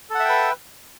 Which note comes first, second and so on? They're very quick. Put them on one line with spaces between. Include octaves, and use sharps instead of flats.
A4 F#5 E5 G5 B4